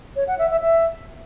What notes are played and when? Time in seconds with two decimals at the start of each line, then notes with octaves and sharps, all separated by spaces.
0.16 C#5
0.27 F#5
0.39 E5
0.50 E5
0.61 E5